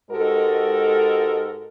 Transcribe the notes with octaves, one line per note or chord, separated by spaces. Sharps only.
G#2 G#3 F#4 G4 A4 A#4